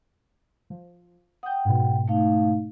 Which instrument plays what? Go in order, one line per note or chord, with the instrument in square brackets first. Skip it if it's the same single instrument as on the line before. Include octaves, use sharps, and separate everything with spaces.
[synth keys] F3
[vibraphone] F#5 G5 [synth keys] D#6 G6
[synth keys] G#2 B2
[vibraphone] A3 D#4 F5